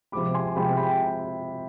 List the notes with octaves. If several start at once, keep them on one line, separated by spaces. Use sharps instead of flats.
C3 F3 G#3 B5 D6
G#5 C6
C3 F3 G#3 G5 B5
G5 B5